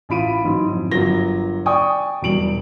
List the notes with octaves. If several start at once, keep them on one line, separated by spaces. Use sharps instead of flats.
A1 F4 B5 D7 D#7
G#2 E3 F#3
F2
G1 F#3 A#4 A#6 G7
D5 G5 G#5 C#6 D#6
E1 F#3 G3 D7 F#7